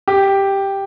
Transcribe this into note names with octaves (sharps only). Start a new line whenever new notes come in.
G4